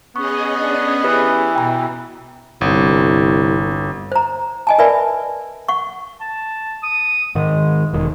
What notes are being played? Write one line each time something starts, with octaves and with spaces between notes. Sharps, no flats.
B3 C#4 G#4 D#5 C#6
D4
E3 G4 B4
B2 G5 A#5
G1 C2
C5 A#5
D#5 G#5 A5
A#4 B4 D5 E5 G#5 B5
F#5 C#6
A5
D#6
G#2 D#3 G#3
E1 D#3